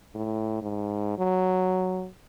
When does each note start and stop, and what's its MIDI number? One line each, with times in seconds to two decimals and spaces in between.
0.15 0.58 45
0.62 1.17 44
1.18 2.07 54